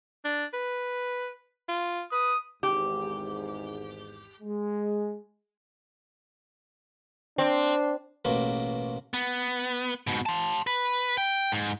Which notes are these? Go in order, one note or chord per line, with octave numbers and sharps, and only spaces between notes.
D4
B4
F4
B4 D#6
G#1 E2 G#2 G4
G#3
C4 D4
A1 B2 A#3
B3
G#2 B2
A5 C6
B4
G5
G#2